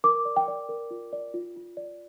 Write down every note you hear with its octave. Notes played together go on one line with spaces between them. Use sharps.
A#4 D6
D5
G5
D5
A#4
F4
D5
F4
F4
D5